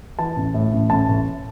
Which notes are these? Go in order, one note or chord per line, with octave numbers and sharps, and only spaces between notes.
E3 A5
A1
A2
A1
A1 A5
A1